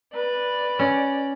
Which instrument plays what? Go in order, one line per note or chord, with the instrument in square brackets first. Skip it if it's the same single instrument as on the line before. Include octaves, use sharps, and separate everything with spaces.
[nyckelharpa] B4 [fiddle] D5
[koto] C#4